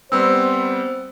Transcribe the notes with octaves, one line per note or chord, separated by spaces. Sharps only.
G3 B3 C4 C5 E6